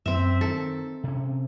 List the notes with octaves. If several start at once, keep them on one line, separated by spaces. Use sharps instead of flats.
F#2 C4 E5
D#3 A4
C3 C#4